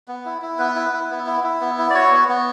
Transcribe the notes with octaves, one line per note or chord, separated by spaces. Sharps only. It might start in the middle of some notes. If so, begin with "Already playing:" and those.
B3
E4
E4
B3 B4
E4
E4
B3
E4
E4
B3
E4
D5
F#4 C#5
B3
B3